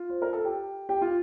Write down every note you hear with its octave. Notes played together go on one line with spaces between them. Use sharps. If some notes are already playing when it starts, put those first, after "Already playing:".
Already playing: F4
C5
A#4
A4
G4
G4
F4